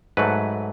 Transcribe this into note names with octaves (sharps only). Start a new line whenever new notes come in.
G#2 F#3 A3 B4